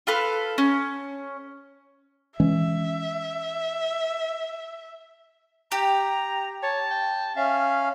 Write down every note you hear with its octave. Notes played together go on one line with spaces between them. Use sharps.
F4 A4 B4 F6
C#4
E3 G#3 C#4 E5
G4 A#5
C#5 A5
G5
C#4 E5 F5